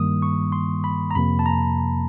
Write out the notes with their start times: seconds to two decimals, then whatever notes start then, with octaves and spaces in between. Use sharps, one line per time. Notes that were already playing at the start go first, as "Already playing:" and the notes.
Already playing: G2 D#3 G3 A#3 D#6
0.22 C#6
0.52 C6
0.84 B5
1.11 A#5
1.15 F2 C3 F3 A#3 B5
1.39 A5
1.46 A#5